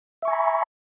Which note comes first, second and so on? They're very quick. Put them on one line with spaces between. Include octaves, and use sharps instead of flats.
E5 C#6 G#5 A#5 B5